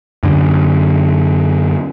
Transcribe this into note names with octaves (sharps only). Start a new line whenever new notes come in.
F#2 D3